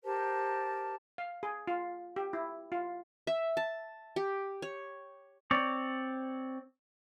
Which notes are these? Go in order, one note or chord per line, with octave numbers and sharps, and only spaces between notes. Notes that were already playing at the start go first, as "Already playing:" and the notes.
G4 A#4 C5 A5
F5
G#4
F4
G4
E4
F4
E5
A5
G4
C#5
C4 C#5 D5